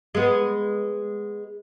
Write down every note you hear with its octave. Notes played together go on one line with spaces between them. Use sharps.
G#3 B3